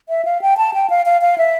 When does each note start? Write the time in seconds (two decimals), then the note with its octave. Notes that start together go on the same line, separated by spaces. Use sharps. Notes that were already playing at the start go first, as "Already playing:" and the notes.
0.09 E5
0.25 F5
0.42 G5
0.57 A5
0.74 G5
0.90 F5
1.06 F5
1.22 F5
1.38 E5